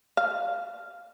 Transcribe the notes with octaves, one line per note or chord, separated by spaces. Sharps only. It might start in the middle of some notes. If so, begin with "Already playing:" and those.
F5